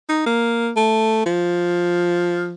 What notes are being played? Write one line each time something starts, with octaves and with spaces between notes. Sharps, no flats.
D#4
A#3
A3
F3